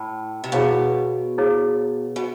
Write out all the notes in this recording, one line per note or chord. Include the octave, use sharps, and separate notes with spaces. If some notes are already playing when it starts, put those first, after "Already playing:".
Already playing: A2
C3
B2 E4 G#4 C#5 F5
E4 G#4 C#5 F5
B2